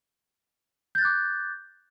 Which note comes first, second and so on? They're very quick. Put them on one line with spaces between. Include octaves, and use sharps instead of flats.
G6 A6 F#6 D6